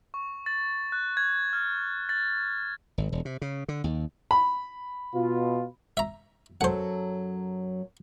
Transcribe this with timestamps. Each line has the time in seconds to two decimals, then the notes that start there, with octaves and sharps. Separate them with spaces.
0.14 C#6
0.46 A6
0.92 F#6
1.17 G#6
1.53 F6
2.09 A6
2.98 G#1
3.12 E1
3.25 C3
3.42 C#3
3.68 D3
3.84 D#2
4.31 B5
5.13 B2 F4
5.97 E5 A#5
6.61 F#2 F#3 A4 C5 F#5